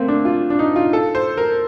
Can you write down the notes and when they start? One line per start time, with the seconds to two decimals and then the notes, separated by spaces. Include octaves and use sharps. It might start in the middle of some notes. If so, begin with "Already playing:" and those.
Already playing: A3 A#3 C4
0.08 D4
0.25 F4
0.50 D4
0.59 D#4
0.76 F4
0.93 A4
1.15 C5
1.37 A#4